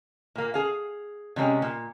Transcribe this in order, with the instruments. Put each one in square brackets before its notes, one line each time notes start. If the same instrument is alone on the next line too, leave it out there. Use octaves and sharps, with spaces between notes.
[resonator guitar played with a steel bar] A#2 A#3
G#4 F5
C3 G3 G#3 C#4
A#2